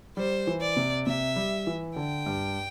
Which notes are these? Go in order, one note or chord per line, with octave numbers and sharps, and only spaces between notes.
G3 C5
E3
D5
C3
C3 E5
G3
E3
D3 G5
G2